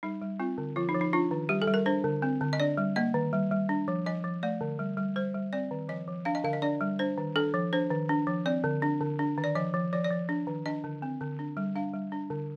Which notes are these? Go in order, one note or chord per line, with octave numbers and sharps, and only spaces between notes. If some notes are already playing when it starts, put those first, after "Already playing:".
G3 D#4
G3
C4 F4
D3
F3 F4
D#4
F3
D#4
D4 F4
D#3
G3 G4
A4
G3
A#4
D4 C5
D3
C4
D3
D#5
D4 D5
G3
A#3 D#5
D#3
G3
G3
D4
F3
F3 D#5
F3
A3 D5
D3
G3
G3
G3 C5
G3
C4 D5
D#3
F3 D#5
F3
D4 F5
D#5
D3 F5
D#5
D4 D5
G3
D4 C5
D#3
D4 A4
F3
D4 C5
D#3
D4
F3
C4 D5
D3
D4
D3
D4
D#3
D5
F3 D#5
F3
F3 D5
D5
F3
D4
D#3
D4 D#5
D3
C4
D3
D4
G3
D4 F5
G3
D4
D3